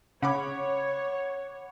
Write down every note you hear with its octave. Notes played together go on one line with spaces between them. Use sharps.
C#3 C#5 F#5 B5 D6